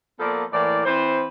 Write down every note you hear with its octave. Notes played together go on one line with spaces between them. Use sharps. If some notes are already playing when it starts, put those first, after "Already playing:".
F3 A#3 B3 A4 A#4 D5
A2 E3 A#3 D5
E3 C4 B4 C5